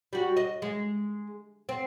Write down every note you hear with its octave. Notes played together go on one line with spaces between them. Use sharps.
G3 F#4
D#5
G#3
C4